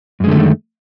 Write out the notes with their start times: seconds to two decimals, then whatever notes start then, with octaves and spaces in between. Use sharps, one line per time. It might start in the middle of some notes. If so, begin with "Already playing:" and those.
0.20 F#2
0.24 G#3
0.28 D3
0.31 A3
0.35 D#3